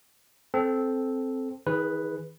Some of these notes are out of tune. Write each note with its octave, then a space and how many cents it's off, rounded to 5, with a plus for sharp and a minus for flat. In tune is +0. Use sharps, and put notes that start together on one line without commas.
C4 +0 A4 -10
D#3 +45 G#4 +0 B4 +0